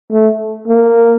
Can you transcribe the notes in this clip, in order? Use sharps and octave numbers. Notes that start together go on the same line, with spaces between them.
A3
A#3